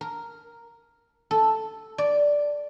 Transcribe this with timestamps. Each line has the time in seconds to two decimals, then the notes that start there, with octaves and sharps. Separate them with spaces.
0.01 A#4
1.31 A4
1.98 D5